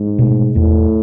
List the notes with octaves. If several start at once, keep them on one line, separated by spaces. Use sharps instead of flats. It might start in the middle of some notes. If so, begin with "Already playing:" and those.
Already playing: G#2
B2 A3
E2 A2